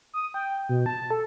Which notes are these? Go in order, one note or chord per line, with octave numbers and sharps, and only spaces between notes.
D#6
G5
B2
A5
A4